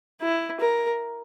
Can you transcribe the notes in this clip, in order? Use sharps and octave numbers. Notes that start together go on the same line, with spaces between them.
E4
A#4